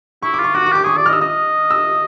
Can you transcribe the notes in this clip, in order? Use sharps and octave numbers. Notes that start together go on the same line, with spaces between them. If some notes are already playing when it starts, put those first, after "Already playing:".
E4 C#6
D6
F4 C#6
F#4 D6
C#6
G4 D6
G#4 C#6
D5
F6
D#5
E6
D#5 D#6
E6